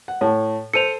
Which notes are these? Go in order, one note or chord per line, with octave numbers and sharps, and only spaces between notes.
F#5
A2 C#5 A5
A4 C5 C#7 D#7 F7